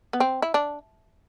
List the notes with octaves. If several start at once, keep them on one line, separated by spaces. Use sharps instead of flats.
B3
C4
E4
D4